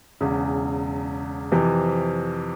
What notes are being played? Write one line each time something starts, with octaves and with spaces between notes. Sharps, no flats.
E1 E2 C#3
F2 C3 E3